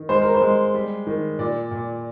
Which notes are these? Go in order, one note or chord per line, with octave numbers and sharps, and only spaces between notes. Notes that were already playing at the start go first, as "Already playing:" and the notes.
Already playing: D#3
G#3 C5
A#4
C5
G#3
G3
D#3
A#2 D5
A#2